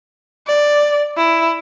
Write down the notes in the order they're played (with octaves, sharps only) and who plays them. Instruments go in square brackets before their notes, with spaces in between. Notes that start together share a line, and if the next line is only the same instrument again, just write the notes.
[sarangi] D5
E4